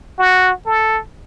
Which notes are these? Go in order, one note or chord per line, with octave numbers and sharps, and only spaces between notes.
F#4
A4